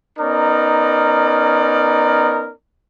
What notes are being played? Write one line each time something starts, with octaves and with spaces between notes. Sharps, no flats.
B3 C#4 D#4 A#4 D5